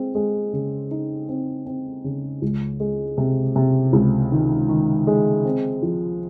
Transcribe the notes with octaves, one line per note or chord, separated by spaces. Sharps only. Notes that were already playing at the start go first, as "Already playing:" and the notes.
Already playing: G#3 C4
G#3
C#3
D#4
C4
C4
C#3
C#2
G#3
C3
C3
C#2
D#3
D#3
G#3
C4
F3